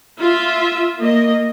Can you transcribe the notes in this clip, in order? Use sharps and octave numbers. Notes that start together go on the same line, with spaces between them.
F4 E5
A#3 D#5